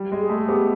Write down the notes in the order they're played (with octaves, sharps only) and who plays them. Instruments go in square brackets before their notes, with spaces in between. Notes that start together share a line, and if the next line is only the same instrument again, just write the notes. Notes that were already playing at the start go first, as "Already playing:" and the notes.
Already playing: [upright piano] G3
G#3
[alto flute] G#4
[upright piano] A3
[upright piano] B3 [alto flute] G4